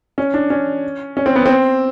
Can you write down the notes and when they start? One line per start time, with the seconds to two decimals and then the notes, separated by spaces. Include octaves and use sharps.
0.18 C#4
0.34 D4
0.50 C#4
1.17 C#4
1.26 C4
1.36 B3
1.46 C4